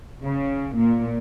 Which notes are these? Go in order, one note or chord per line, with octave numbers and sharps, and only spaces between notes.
C#3
A#2